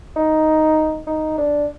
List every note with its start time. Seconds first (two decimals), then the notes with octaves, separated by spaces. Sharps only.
0.16 D#4
1.07 D#4
1.38 D4